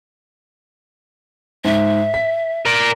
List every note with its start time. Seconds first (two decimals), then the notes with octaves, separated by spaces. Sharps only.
1.65 G#2 E5
2.14 B6
2.66 A#4 D5